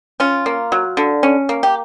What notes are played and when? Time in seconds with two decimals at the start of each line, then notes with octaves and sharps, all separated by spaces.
0.20 C#4 F4
0.46 A#3
0.72 F#3
0.97 D3
1.23 C#4
1.49 A#3
1.63 G4